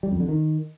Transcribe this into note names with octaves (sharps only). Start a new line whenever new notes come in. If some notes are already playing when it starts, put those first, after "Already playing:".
G3
F2
D3
D#3